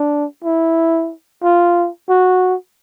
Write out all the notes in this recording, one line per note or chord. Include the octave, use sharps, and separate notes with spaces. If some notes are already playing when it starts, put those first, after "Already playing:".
Already playing: D4
E4
F4
F#4